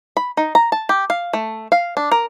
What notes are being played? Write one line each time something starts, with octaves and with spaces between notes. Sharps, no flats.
B5
D#4
A#5
A5
G4
F5
A3
F5
D4
A#4